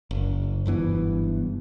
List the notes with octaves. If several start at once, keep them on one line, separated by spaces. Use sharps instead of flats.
F#1
F#1 G2 E3 B3